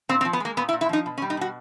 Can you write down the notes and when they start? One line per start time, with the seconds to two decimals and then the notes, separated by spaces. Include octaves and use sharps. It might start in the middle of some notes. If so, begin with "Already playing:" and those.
0.09 A#2 C4
0.21 C4
0.25 F3
0.33 B3
0.40 G#3 A#3
0.57 A#2 B3
0.69 E4
0.73 A#2
0.81 E4
0.89 F3 D#4
1.06 B2
1.18 C#4
1.22 G3
1.30 D#4
1.37 B2 F#4